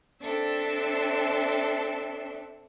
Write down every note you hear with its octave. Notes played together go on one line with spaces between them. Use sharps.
C4 D4 A4 E5